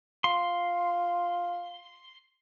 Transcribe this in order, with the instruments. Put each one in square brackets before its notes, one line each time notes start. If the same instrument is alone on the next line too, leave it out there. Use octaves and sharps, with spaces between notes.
[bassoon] F4 [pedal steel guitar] C6